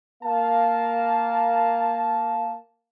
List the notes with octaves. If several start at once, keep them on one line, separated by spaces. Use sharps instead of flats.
A#3 F5 A5